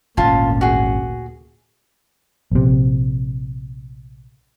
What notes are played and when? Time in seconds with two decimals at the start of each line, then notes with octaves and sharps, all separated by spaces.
0.17 G#1 D2 A#2 C#4 F4 A5
0.61 F#4 G#4
2.52 A#1 C3